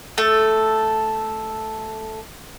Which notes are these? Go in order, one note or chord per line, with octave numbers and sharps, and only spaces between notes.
A3 A4